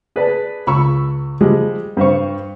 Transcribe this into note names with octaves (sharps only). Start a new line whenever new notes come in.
G#4 B4 D5 A5
C#2 B5 C#6 E6
F3 G3 G#3
G2 C5 F5 C#6